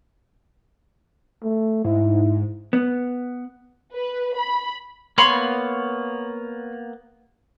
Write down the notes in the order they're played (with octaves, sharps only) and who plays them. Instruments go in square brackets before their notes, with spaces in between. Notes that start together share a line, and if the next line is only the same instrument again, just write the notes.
[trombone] A3
[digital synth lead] G#2 [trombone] E4
[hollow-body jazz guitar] B3
[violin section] B4
B5
[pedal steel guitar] A#3 B3 [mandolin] C#5 B5 C6